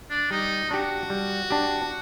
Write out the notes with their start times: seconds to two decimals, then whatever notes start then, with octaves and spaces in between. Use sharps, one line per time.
0.11 D4
0.31 G3 D#4
0.70 D4 F#4 G4
1.10 G3
1.50 D4 G4